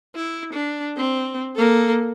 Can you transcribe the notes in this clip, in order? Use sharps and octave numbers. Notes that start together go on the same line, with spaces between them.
E4
D4
C4
A#3 A4